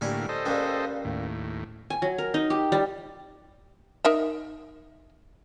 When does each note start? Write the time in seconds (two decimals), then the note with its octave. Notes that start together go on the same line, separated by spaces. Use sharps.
0.01 A2 D3 G3 A#3 G#5 C#6
0.29 A4 C5 D#5
0.46 C#2 A#2 G3
1.05 D#2 A2
1.90 G#5
2.02 F#3
2.18 A#4
2.34 D#4
2.50 G4
2.72 G3
4.05 D#4 A#4 E5